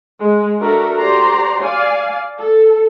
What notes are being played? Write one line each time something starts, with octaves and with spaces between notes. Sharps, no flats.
G#3
D4 F#4 A4 A#4 E5
F#4 G4 C5 D5 A#5 C6
D5 F5 G#5
A4